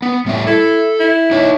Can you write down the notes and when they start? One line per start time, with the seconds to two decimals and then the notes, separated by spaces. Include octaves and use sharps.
0.02 B3
0.26 A2 G3 E5
0.47 E4 A4
0.99 E4
1.31 D#4 C#5 D#5